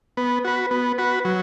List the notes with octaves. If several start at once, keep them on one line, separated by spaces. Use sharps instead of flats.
B3
F#4 B4
B3
F#4 B4
F#3